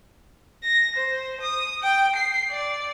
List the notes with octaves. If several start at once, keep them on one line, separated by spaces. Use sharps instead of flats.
A#6
C5
D#6
G5
C7
D5